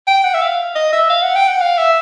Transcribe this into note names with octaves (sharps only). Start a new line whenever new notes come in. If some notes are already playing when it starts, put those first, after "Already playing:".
G5
F#5
E5
F5
D#5
E5
F5
F#5
G5
F#5
F5
E5